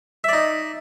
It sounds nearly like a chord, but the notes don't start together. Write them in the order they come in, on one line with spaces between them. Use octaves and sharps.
E5 D5 D#4